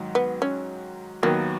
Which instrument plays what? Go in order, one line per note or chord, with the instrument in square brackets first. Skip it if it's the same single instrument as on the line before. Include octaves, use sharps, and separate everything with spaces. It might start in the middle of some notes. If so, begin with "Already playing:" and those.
Already playing: [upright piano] G#2 D#3 F#3
[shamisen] B3
C#4
[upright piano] D#2 D#3 F#3 B3 [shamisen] A#3